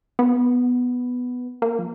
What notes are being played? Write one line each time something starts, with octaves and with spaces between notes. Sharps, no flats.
B3
A#3
F3